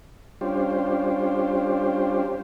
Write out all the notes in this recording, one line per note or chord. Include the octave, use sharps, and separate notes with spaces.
G3 C#4 D4 F4 G4 C5